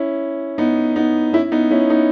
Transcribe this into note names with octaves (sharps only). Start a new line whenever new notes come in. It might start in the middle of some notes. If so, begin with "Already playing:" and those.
Already playing: C#4 E4
B3 D#4
B3 D#4
C#4 E4
B3 D#4
C#4 E4
B3 D#4